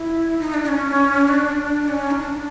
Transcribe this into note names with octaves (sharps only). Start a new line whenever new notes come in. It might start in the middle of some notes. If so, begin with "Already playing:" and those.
Already playing: E4
D#4
D4
D4
C#4
D4
C#4
D#4
D4